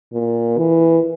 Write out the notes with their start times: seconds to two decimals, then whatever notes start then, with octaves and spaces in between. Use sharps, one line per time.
0.13 A#2
0.58 E3